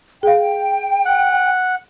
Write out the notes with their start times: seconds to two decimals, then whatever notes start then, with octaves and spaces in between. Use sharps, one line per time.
0.23 G#4 F5 G5
1.05 F#5